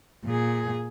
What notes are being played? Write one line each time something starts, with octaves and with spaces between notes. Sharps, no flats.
A#2 G#4